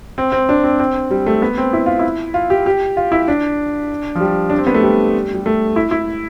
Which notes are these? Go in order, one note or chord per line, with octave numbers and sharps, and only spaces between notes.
C4
C4
D4
C4
C4
G3
A3
B3
C4
E4
F4
E4
F4
G4
G4
F4
E4
D4
F3
G3
D4
C4
B3
A3
G3
G3
A3
E4
E4